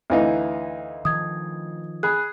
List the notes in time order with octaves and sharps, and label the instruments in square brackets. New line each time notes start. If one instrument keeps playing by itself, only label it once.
[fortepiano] D2 E3 D#4 [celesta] E5 F5
[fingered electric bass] D#3 F3 [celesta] D#6 G#6
[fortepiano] G#4 [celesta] B5 F#6